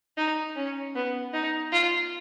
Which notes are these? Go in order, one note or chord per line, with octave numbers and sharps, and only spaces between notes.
D#4
C#4
B3
D#4
F4